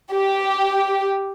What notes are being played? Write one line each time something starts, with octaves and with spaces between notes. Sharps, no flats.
G4